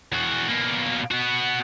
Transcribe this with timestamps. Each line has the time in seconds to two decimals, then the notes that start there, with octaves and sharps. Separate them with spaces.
0.12 E2 F#4
0.48 B2 A#3
1.11 B3 F#4